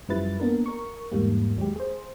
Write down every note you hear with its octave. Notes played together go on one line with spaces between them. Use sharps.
F#2 F3 G3 E4 B4 A6
A#3 B3 D4 A#4
A#4 C#6
E2 G#2 G3 A#3
D#2 F#3 G#3 G4
G#4 C5